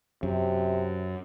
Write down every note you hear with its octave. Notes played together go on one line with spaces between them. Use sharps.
F#2 C3